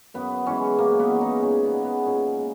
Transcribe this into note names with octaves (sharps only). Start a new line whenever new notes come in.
F#2 B3
E3 G#3 C#4
F#2 A#3
B3
E3 G#3
D#4
A#2 C#4
B3
G#3
B3
A#2 C#4
G#3